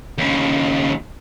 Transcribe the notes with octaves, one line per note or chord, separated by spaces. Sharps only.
D#2 C#3